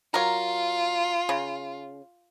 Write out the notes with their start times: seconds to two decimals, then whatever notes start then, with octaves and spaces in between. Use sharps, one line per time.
0.14 F#3 F4 A#4
1.29 C#3